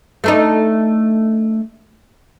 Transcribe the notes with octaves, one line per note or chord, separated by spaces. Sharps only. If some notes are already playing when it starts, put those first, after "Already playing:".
A3 D4 D#4